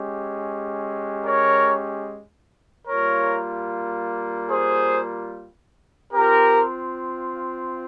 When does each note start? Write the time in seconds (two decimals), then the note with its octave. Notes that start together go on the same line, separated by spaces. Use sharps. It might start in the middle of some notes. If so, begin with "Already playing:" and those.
Already playing: G#3 C#4 G4
1.25 A#4 C#5
2.88 G3 A#3 F4 A#4 C#5
4.50 G#4 C5
6.13 C4 F4 G4 A#4